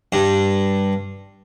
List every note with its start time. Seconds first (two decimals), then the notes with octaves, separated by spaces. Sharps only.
0.12 G2